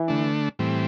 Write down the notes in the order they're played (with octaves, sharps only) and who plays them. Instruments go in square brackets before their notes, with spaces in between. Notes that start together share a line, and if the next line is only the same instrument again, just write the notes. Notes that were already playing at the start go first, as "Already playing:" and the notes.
Already playing: [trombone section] E3
[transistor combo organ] D3 A3 D4
A2 E3 G3 C4